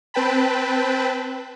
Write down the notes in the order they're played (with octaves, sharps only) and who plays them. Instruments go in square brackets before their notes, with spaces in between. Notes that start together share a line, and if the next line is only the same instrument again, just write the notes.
[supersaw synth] C4 B4 G5 A5 B5